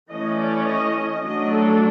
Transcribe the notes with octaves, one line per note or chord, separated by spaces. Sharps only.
E3 A3 C#4 D#5
D5
D#5
D#5
F#3 A3 D4 D#5
A4